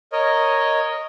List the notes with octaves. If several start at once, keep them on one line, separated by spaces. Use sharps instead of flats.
A#4 C#5 D#5